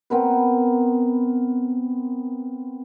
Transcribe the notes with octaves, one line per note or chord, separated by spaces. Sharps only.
B3 C4 A#4 B4